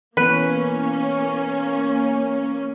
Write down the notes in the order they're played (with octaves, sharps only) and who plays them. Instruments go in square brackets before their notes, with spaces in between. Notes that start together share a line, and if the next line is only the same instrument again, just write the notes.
[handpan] E3 B3 [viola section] A#3 C#4 [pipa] B4